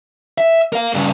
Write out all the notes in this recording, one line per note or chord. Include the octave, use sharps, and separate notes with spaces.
E5
A#4 F5
G2 C#3